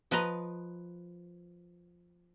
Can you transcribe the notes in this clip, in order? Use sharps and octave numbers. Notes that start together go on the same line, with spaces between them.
F3 B4 D#5 A#5